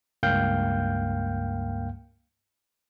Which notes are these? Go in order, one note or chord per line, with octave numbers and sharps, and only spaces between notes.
C#2 G2 A#3 F5 G5 G6